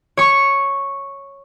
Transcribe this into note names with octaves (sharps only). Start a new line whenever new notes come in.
C#5 C#6